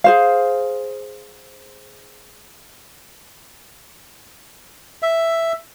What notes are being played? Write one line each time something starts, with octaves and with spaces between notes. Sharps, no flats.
G#4 C5 F5
E5